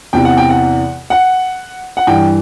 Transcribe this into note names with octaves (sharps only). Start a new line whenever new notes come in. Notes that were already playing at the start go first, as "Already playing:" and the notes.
E2 C3 E3 G5
F#5
G5
F#5
F#5
F#5
G2 E3 G5